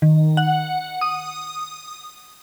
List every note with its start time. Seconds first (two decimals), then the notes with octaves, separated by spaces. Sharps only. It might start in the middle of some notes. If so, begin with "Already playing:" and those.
0.02 D#3
0.37 F#5
1.01 D#6